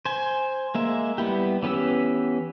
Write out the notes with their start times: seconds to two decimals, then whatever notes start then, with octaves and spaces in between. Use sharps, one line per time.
0.05 C5 G#5
0.75 G#3 A#3 E5
1.18 G3 B3 E4 G4
1.62 E3 B3 C#4 G4 E6